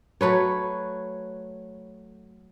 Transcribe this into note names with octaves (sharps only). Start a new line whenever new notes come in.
F#3 A3 B4 C#5